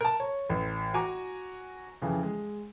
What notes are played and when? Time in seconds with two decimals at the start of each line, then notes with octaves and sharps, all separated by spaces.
0.01 A#4 A5
0.20 C#5
0.50 A1
0.94 F#4 G#5 A#5 D6
2.02 F2 C#3 E3
2.23 G#3